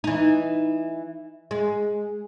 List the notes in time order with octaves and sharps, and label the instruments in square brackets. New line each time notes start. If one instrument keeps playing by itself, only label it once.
[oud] E3 D#4
G#3